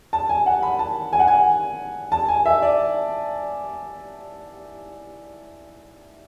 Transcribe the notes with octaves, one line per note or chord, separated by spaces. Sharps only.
A5
G#5
F#5
B5
A5
G#5
F#5
G#5
A5
G#5
E5
D5